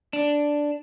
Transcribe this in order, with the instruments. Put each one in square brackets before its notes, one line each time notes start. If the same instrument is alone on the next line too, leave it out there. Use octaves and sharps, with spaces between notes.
[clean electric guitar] D4